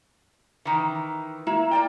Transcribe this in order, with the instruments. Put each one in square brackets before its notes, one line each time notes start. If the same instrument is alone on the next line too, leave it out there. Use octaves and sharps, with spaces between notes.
[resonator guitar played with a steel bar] D#3 E3
[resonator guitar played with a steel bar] A#3 [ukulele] E4
[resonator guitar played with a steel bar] A#3 D5 G5